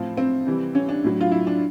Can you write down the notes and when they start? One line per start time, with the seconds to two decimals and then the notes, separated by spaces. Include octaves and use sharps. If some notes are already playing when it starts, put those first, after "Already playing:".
Already playing: A2 F3 C4
0.17 C4
0.47 C3 E3 G3
0.75 C#4
0.89 D4
1.04 A2 F#3
1.21 F4
1.31 E4
1.47 D4